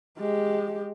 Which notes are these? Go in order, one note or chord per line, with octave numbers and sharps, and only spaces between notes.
G#3 G4